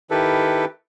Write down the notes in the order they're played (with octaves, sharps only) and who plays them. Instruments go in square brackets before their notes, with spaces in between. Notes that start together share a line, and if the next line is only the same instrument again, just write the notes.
[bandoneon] D#3 E4 G4 A4 B4